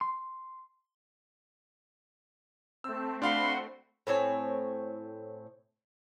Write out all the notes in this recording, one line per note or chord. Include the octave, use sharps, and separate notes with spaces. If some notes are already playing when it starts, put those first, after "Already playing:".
C6
A3 C4 A5 E6
D4 F#4 F5 B5 C6
A2 C4 C#5 G#5